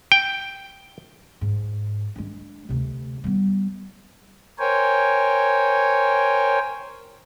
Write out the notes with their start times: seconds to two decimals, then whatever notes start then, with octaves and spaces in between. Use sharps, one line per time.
0.12 G5
1.41 G#2
2.16 G#3 D4
2.69 D2 C3
3.24 G3 B3
4.59 A#4 C5 C#5 G5 G#5